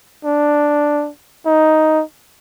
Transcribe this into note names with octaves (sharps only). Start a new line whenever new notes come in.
D4
D#4